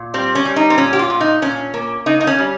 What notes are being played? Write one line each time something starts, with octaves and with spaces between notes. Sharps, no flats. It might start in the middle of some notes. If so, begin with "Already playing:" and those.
Already playing: A#2
G3 C4
C#4
G3
D#4
C4
A#2 C#4
G4
F4
A#2
D#4
A#2 C#4
A#3
C#3 D#4
D#4
C#4
G3